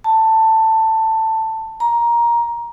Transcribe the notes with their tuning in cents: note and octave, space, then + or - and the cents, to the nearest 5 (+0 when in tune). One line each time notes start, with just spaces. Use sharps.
A5 +15
A#5 +15